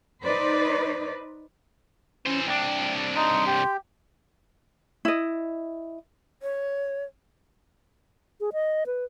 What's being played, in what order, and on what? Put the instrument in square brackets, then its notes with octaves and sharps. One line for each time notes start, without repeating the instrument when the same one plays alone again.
[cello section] D#4 B4 C5 D5
[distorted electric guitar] E3 C5 [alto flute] C#4
[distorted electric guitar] C2 D4 [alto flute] G5
[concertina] D#4 [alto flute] C6
[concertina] G4
[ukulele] E4 D#5
[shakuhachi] C#5
[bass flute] G#4
D#5
B4